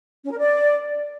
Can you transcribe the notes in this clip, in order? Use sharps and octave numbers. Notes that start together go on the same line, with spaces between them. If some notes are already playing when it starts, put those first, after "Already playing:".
C#4
A#4
D5